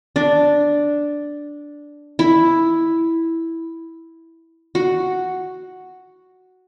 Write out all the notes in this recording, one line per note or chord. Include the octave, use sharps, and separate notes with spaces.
D4
E4
F#4